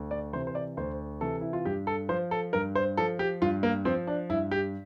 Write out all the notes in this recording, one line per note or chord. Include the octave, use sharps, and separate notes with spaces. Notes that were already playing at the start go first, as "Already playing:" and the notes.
Already playing: D2
D5
C3 E3 C5
C5
D5
D2 C5
C3 E3 A4
E4
F4
G2 G4
A4
F3 C5
A4
G2 A#4
C5
F3 A4
G4
G2 F4
A#3
F3 C4
D4
G2 E4
G4